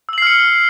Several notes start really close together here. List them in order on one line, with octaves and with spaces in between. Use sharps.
E6 F#7 C7 F6 C#7